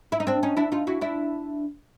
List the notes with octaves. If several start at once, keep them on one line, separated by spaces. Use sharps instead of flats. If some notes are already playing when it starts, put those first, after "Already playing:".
E4
D#4
C4 D4
C#4 D#4
D4 E4
D#4 F4
E4 F#4
D4 E4